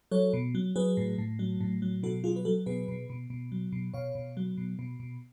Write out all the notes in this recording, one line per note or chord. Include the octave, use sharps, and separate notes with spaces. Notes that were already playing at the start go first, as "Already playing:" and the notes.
F#3 A4 C#5
B2
F#3
F#3 G#4 B4
A2
A2
F#3
A2
F#3
B2 F#4 A4
F#3 F4 G#4
B4
F#3 F#4 A4
B2 G#4 B4
B2
B2
B2
F#3
B2
B2 C#5 F5
B2
F#3
B2
B2
B2